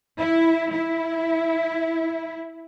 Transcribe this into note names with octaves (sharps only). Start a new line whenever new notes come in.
E4
E4